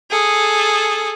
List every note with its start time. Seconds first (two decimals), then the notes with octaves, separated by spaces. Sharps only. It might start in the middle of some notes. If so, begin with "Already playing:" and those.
0.11 G#4 A4